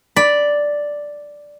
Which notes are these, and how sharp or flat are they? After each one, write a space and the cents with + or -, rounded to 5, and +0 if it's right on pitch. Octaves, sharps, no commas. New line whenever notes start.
D5 +0 B5 +0